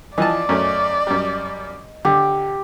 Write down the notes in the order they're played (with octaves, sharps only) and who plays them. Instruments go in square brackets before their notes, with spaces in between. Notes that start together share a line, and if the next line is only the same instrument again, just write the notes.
[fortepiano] E3 F3 A5 [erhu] D5 [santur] D#5
[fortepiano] F#2 A3 C#4
F#2 G3
[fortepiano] D3 [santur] G4